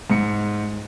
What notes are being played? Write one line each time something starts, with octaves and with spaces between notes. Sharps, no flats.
G#2 C#7